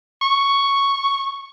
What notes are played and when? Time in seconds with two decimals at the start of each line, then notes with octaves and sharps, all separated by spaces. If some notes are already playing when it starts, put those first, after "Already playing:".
0.21 C#6